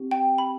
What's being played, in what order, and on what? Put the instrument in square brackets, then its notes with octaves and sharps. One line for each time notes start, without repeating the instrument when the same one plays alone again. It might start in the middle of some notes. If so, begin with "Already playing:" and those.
Already playing: [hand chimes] C4 G4
[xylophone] G5
B5